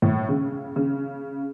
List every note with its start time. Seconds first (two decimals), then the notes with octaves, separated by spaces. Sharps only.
0.02 A2
0.29 C#3
0.76 C#3